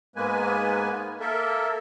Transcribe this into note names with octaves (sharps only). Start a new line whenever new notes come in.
G#2 G#3 A#3 B3 B4 G#5
A#3 A4 A#4 E5